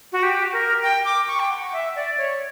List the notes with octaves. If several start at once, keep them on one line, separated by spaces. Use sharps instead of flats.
F#4
G4
A#4
G5
D6
C#6
G5
F#5
E5
D5
C#5